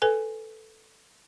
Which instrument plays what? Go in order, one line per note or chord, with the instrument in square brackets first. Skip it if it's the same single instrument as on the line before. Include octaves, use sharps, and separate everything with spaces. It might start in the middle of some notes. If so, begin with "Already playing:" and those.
[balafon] A4 B4 G#5